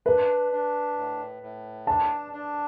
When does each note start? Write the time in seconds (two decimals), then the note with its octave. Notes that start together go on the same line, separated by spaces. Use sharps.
0.06 D4 B4
0.52 D4
0.97 A2
1.42 A2
1.87 D4 A5
2.33 D4